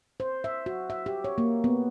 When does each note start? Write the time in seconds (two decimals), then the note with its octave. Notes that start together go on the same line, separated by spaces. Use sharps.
0.20 C5
0.44 E5
0.66 F#4
0.90 E5
1.06 G4
1.24 C#5
1.38 A#3
1.64 B3